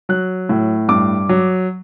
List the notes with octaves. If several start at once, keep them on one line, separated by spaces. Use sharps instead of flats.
F#3 F#6
A2
G2 D6
F#3